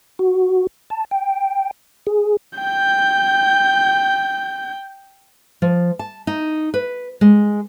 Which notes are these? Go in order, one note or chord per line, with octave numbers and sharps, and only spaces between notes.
F#4
A5
G5
G#4
G5 G6
F3
A5
D#4
B4
G#3